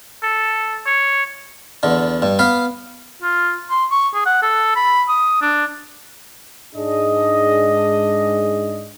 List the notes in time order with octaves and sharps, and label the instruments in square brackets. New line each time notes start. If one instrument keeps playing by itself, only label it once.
[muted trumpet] A4
C#5
[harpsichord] E2 D3
G2
B3 B4 F5
[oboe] F4
C6
C#6
G#4
F#5
A4
B5
D#6
D4
[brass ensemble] G#2 D4 G#4 D#5